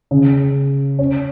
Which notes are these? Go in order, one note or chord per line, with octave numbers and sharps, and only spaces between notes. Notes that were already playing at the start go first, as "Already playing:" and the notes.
C#3
C#4